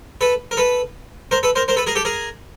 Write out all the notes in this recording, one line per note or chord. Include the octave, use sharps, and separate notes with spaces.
A4 B4
A#4
A4 B4
A#4 C5
A4 B4
A#4 C5
A#4 C5
A4 B4
G#4 A#4
G4 A4
G#4 A#4